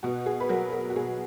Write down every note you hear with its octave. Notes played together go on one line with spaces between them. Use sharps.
B2 F#4
G#4
B4
F#3 A#4
A#4
F#4
B2 G#4